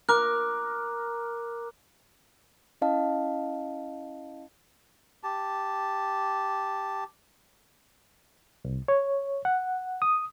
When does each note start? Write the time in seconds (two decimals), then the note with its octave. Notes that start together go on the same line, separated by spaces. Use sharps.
0.09 A#4 D6 F#6
2.82 C#4 E4 D#5 F5 A5
5.24 G4 A5
8.65 C2
8.88 C#5
9.45 F#5
10.02 D#6